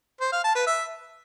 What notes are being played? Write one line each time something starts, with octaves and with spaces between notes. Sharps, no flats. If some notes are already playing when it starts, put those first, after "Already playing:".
C5
F5
A5
B4
E5